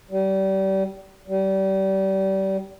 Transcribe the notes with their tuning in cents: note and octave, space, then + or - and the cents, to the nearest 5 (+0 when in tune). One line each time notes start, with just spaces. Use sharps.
G3 -30
G3 -30